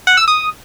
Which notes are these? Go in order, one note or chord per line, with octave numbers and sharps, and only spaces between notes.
F#5
E6
D#6